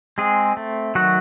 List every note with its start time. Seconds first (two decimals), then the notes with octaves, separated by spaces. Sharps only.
0.18 G#3 C4 G#4
0.57 A3
0.95 D#3 F#3 F#4